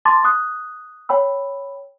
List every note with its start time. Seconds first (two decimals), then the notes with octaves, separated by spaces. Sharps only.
0.05 A5 C6 D6 A6
0.24 C#6 D#6 F#6
1.09 C#5 G5 B5 E6